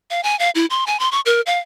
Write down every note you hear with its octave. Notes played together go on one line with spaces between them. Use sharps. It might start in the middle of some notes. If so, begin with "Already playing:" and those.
F5
G#5
F5
E4
C6
G#5
C6
C#6
A#4
F5